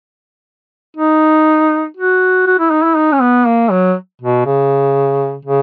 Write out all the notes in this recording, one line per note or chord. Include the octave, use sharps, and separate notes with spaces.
D#4
F#4
F#4
E4
D#4
E4
D#4
C#4
B3
A#3
F#3
B2
C#3
C#3